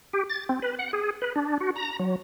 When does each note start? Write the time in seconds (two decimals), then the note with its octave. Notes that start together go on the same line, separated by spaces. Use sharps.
0.13 G4
0.30 A6
0.49 C4
0.62 B4
0.79 F#5
0.93 G#4
1.22 B4
1.36 D4
1.60 F#4
1.76 A#5
2.00 F#3